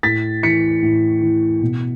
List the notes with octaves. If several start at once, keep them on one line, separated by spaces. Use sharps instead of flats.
A2 A6 B6
E3 B6 C#7
A2
E3
B2